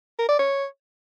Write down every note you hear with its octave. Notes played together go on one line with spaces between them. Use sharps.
A#4
D5
C#5